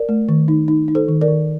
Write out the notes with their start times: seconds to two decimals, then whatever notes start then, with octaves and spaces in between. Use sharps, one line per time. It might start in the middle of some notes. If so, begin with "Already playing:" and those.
Already playing: A#4 D5
0.09 A3
0.29 D#3
0.48 D#4
0.68 D#4
0.88 D#4
0.95 A4 C5
1.08 D#3
1.21 A#4 D5
1.28 D#3